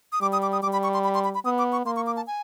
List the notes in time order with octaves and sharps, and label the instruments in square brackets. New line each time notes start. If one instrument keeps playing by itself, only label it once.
[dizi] D#6
[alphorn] G3 [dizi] D6
[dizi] D#6
D6
D#6
[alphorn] G3 [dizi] D6
[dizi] B5
C#6
C6
B5
C6
B5
B5
[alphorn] B3 [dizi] D#6
[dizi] D6
C#6
[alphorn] A#3 [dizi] C6
[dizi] C#6
D6
A5
G#5